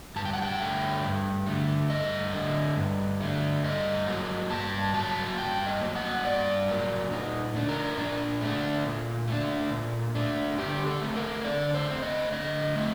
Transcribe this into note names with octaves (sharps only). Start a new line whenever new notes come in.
G2 A5
G5
F#5
G5
D3 A3
G2
D3 A3
G2 D#5
D3 A3
G2
D3 A3
G2 D#5
F#3 A#3
G2 A5
F#3 A#3 A5
G2 G5
D#5
F#3 A#3
F#5
G2 D5
F#3 A#3
A#2 D#4
A3 D4
A#4
A#2 D4
A3 D4
A#2
A3 D4
A#2
A3 D4
D3 G4
A4
A3 C4
A#4
D3 D5
C5
A3 C4
D#5
D3 D#5
A3 C4